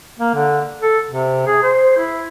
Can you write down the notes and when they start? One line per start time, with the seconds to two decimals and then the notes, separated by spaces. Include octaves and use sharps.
0.19 A#3
0.34 D3
0.81 A4
1.08 C3
1.46 G#4
1.63 C5
1.97 E4